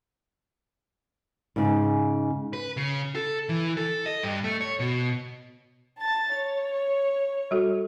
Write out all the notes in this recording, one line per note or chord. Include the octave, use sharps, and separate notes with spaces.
G#2 C#3
B4
C#3
A4
E3
A4
D#5
G2
A3
C#5
B2
A5 A6
C#5
G3 F#4 A4